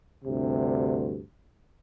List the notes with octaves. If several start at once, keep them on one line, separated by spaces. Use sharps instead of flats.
D2 G2 C3